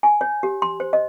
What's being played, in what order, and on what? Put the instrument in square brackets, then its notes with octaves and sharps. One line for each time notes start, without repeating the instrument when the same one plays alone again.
[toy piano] G#5
C#5
G4
C6
C5
D#5